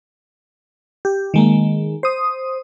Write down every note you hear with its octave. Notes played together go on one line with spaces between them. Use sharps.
G4
D#3 G#3 A#3
C5 D#6